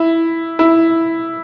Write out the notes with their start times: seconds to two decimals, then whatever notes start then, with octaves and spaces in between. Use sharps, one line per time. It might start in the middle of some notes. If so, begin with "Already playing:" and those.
Already playing: E4
0.59 E4